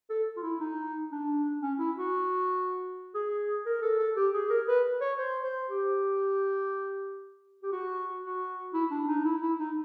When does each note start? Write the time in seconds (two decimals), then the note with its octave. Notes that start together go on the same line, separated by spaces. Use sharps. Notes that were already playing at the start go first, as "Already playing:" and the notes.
0.10 A4
0.36 F4
0.43 E4
0.60 D#4
1.12 D4
1.62 C#4
1.79 E4
1.96 F#4
3.14 G#4
3.66 A#4
3.82 A4
3.99 A4
4.16 G4
4.34 G#4
4.50 A#4
4.68 B4
5.01 C#5
5.18 C5
5.43 C5
5.69 G4
7.63 G4
7.72 F#4
8.24 F#4
8.74 E4
8.91 D4
9.08 D#4
9.24 E4
9.42 E4
9.59 D#4